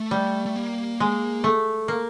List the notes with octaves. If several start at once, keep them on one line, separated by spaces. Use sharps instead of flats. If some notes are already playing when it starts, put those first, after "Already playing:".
Already playing: A3
G3
A3
A#3
G#3
A3
A#3